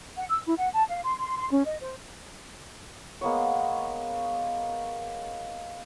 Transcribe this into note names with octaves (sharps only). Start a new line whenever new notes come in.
F#5
E6
E4
F#5
A5
F5
C6
C6
C6
C#4
D#5
C5
G#3 A#3 B3 C#5